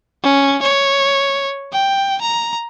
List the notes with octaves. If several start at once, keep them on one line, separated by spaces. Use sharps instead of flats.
C#4
C#5
G5
A#5